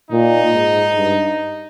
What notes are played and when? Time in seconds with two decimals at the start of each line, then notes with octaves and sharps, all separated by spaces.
0.11 A#2 D#4
0.53 G#2
0.95 G2